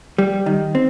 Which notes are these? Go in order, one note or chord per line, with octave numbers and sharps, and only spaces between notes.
G3
D#3
C4